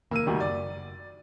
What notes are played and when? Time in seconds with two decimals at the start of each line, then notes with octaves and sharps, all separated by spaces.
0.11 F1 D#2 A#3 E6 D#7
0.26 D2 D#3 G3
0.40 F#1 D5